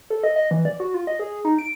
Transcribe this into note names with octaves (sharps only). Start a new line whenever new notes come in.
A4
D#5
D#5
E3
D5
F#4
F4
D#5
G#4
D#4
D7